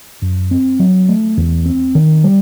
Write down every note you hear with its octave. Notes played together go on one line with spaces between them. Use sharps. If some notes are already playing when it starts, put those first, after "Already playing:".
F#2
C4
F#3
A3
E2
C4
D#3
G3